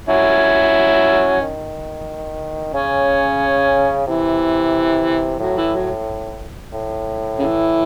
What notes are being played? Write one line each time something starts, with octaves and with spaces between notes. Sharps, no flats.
F#3 C#4 E4
D#3
C#3 C#4
C3 E3
A2 F#3
E3
F#3
A2
C#3 E3